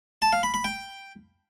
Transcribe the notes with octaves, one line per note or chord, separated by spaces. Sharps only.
A5
F5
B5
B5
G5